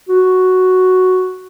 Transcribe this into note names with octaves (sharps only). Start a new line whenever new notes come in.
F#4